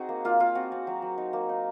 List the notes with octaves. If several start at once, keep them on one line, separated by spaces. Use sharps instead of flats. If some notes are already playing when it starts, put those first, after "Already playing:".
Already playing: C4 D#4 F#4 G#4
A#3
A#3 F4
A#3 F4
C4 F#4
C4
F#3
F#3
D#4
A#3
D#4